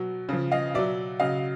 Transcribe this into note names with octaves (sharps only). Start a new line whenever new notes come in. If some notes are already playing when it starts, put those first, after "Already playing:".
Already playing: B2 F#3
C#3 F3
D#5 F5
B2 F#3 D5 E5
C#3 F#3 D#5 F5